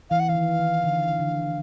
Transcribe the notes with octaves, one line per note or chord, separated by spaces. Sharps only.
E3 F5
F#5
E3 F5
D#3
D#3
D3
D3